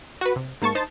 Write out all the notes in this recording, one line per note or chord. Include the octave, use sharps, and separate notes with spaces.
F#4 B4
C3
G#2 A#3 A5 C#6
D#4 C5 A5